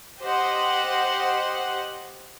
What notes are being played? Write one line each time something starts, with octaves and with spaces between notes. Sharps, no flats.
G4 C5 D#5 F#5